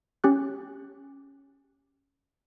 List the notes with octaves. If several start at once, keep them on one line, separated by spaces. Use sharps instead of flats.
C#4 G4 F#6